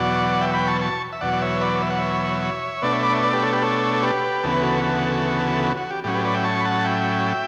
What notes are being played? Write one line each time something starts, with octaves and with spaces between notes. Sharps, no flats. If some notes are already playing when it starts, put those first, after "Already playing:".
Already playing: E2 B2 F#3 D5 F#5
E5 G5
G5 B5
A5 C#6
A5 C#6
E5
E2 B2 F#3 D5 F#5
D5
C#5 E5
B4 D5
E5
F#5
C#5 E5
B2 A3 D4 B4 D5
C#5 E5
B5 D6
C#5 E5
B4 D5
G4 B4
A4 C#5
G4 B4
A4 C#5
A4
G4 B4
D2 C#3 E3 B3 A4
B4
F#4 A4
F#4 A4
F#4
F#4
G4
A2 F#3 C#4 G4
G4 B4
B4 D5
E5 G5
A5 C#6
B5
F#5 A5
E5 G5